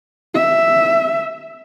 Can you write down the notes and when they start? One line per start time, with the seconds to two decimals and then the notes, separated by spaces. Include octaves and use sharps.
0.35 E5